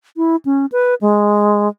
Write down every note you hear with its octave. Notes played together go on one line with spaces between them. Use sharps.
E4
C#4
B4
G#3